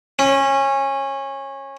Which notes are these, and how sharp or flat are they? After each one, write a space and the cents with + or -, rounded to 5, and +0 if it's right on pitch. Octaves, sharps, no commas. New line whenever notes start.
C#4 -20